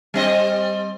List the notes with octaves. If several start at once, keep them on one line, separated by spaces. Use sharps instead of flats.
G3 C4 D#5